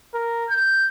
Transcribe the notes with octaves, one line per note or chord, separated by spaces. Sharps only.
A#4
G6